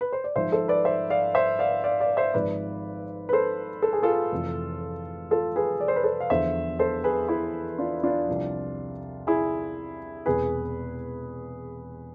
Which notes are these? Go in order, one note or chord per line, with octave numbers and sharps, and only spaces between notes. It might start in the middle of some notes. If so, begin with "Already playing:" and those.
B4
C5
D5
G#1 G#2 F3 C5 E5
A4 C5
B4 D5
C5 E5
D5 F5
C5 E5
D5 F5
D5 F5
D5 F5
C5 E5
G#1 G#2 F3 B4 D5
B4
A4 C5
A4
G#4
F4 A4
F1 F2 E3
F4 A4
G#4 B4
D5
C5
B4
A4 C5
F5
E2 D3 F3 C5 E5
A4 C5
G#4 B4
E4 G#4
D4 F4
D4 F4
C2 C3 F3
E4 G#4
E1 E2 C3 G#4 B4